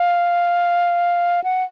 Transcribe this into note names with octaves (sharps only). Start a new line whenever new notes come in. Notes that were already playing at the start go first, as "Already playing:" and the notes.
Already playing: F5
F#5